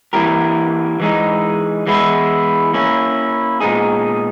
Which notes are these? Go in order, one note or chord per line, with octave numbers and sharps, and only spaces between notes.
E3 A#3 E4 G4 A#4
E3 G#3 D#4
E3 G#3 B3 E4
A#3 C#4 E4
A#2 G#3 B3 D#4 G#4